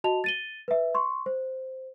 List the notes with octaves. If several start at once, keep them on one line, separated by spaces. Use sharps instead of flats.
F#4 D#5 A5 F7
A6 D#7 G7
B4 E5
C6 C#6
C5